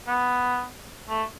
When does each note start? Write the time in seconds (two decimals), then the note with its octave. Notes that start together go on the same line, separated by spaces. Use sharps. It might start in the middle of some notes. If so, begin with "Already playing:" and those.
0.07 B3
1.09 A3